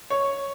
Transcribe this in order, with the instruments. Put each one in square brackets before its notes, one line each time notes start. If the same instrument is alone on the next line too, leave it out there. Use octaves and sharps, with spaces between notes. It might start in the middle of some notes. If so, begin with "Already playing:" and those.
[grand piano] C#5